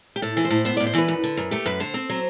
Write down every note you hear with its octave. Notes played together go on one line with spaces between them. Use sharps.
G4
A2 A4
E3
C5
A2
B3 C5
A2 D5
C5
E3 B4
F#2
D3
F#2
A3 G4
F#2 B4
D3 C5
C4
F#3